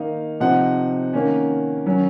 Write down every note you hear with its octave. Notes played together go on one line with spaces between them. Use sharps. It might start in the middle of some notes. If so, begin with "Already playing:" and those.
Already playing: D#3 A#3 D#4 F5
C3 F3 C4 D#4 F#5
D#3 A#3 C#4
D#3 F#3 C#4